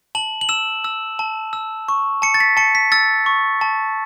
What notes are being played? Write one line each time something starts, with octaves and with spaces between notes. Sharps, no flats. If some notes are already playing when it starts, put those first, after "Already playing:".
A5 F#7
F#7
E6 E7
E6
A5
E6
C#6
A5 C#7
A6
B6
A5 C#7
B6
E6 A6
C#6
A5